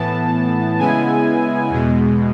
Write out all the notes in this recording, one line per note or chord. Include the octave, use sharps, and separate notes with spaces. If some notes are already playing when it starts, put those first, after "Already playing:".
Already playing: A2 E3 B3 A5
C#3 G#3 B3 E4 G#5
E2 B2 G#3